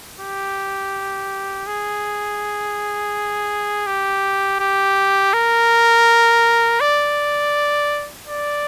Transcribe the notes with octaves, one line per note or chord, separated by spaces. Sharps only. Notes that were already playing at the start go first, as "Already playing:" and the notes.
G4
G#4
G4
G4
A#4
D5
D5